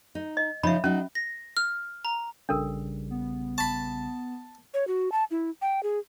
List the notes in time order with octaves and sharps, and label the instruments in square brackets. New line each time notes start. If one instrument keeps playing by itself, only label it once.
[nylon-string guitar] D#4
[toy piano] D#5
[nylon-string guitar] C#3 F3 D#4 [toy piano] E5 B5
[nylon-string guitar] F#3 D#4 [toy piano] C#4
[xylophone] A#6
F6
A#5
[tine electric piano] A#1 C#3 G3 [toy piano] D4 A4 A#4
[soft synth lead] B3
[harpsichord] A5 B5 [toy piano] C#6
[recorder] C#5
F#4
A5
E4
G5
G#4